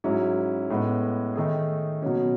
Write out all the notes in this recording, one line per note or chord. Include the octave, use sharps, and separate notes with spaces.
G#2 F#3 C#4 E4
A2 G#3 B3
D#3 A3 D#4 G#4
B2 F#3 C#4